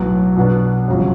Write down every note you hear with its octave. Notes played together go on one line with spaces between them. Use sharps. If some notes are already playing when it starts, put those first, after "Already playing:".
Already playing: B1 A2 F#3 B3
B2 F#3 B3 D4
G1 F2 C#3 F#3